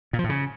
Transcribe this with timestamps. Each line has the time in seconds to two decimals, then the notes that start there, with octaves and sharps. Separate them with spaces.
0.13 A#2
0.19 F3
0.24 A2
0.29 C#3